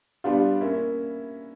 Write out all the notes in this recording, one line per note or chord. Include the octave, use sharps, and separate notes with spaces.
G3 B3 D4 F4
A#3 C#4 E4